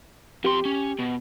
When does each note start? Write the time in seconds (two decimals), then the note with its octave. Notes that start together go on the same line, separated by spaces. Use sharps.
0.44 F2 G4 C6
0.65 C#4
0.99 B2